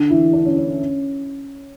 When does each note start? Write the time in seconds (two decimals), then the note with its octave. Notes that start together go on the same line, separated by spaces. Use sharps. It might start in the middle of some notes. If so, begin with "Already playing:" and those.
Already playing: D3 D4
0.10 E3 E4
0.33 D3 D4
0.45 C#4
0.56 C#4
0.67 C#4